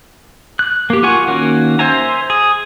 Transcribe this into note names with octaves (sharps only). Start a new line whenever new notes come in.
F#6
A#3 G4
F4 A#4 F#5 G#5 C#6
D#3 A#3 C#4 F#4
C5 E5 G#5 A#5
G#4